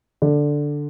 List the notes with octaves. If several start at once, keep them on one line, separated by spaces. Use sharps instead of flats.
D3